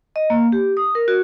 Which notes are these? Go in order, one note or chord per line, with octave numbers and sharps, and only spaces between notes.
D#5
A#3
G4
D#6
A#4
F#4